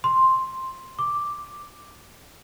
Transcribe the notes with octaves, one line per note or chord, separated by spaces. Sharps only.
C6
D6